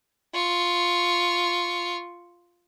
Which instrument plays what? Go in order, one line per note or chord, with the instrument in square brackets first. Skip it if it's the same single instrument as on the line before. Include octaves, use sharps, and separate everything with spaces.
[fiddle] F4 C#6